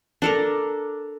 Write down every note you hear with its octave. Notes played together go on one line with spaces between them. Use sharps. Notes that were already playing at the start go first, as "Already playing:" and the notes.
D4 A4 A#4